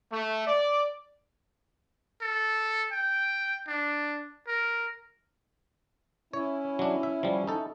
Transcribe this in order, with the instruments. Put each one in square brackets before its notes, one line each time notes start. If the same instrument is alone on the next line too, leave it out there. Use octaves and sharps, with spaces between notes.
[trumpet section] A3
D5
[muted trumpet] A4
G5
D4
A#4
[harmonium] C#4 E4 [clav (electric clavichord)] C#5
[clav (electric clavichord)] F#3 D4
E5
F3 G3
D#4 A4